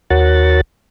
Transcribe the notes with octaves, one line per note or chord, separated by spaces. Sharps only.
D#2 F#4 A#4 C#5 F#5 A6